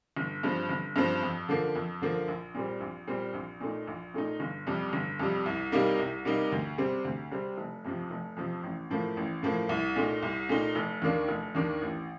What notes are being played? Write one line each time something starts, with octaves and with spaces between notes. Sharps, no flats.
G1
G2 F3 C4
G1
G2 F3 C4
F2
D3 F3 A#3
F2
D3 F3 A#3
A#1
A#2 G3 C4
A#1
A#2 G3 C4
A#1
A#2 A3 D#4
A#1
A#2 A3 D#4
G1
F2 C3 G3
G1
F2 C3 G3
C2
C3 G3 A#3 D#4
C2
C3 G3 A#3 D#4
D2
C3 G3 C4
D2
C3 G3 C4
F1
F2 C3 F3
F1
F2 C3 F3
A1
A2 F3 A#3
A1
A2 F3 A#3
C2
A#2 A3 D#4
C2
A#2 A3 D#4
F1
D#2 D#3 A#3 D4
F1
D#2 D#3 A#3 D4
A1